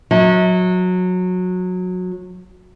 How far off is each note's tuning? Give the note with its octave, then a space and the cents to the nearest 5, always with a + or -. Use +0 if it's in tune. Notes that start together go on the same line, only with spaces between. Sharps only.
F#3 -20 E5 -45